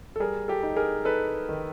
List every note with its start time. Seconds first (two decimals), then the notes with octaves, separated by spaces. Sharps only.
0.16 A4
0.20 G3 G#4 A#4
0.48 G4 A4
0.63 D#4
0.77 G#4 A#4
1.05 D#4 A4 B4
1.49 D#3